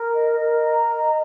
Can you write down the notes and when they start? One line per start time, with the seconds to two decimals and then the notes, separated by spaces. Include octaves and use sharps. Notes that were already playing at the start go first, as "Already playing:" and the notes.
Already playing: A#4
0.14 D#5
0.39 A#4
0.64 A#5
0.88 D#5